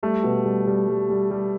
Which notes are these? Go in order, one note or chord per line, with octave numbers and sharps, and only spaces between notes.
G3 A3
B2
G3
G3
G3
G3
G3